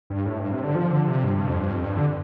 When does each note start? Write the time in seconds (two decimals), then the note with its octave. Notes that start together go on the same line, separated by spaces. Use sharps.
0.10 G2
0.26 A2
0.39 G2
0.51 C3
0.64 D3
0.75 F3
0.91 D3
1.08 C3
1.24 G2
1.35 G2
1.48 F2
1.61 G2
1.73 F2
1.84 G2
1.97 D3